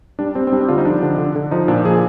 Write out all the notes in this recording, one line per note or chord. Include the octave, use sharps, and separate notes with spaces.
G3 D4
G3 C4
C4
G3 D4
C4
D3 F4
D#4
F3 D4
D3
D3
D3
F3 D#4
A#2 D4
F3 G#4